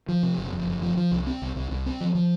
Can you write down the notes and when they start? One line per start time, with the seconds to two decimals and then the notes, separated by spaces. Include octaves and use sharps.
0.08 F3
0.23 C3
0.38 F#1
0.53 F2
0.67 F#1
0.82 F3
0.97 F3
1.11 C2
1.27 C4
1.42 C2
1.56 C2
1.71 C2
1.86 C4
2.01 F3
2.15 F3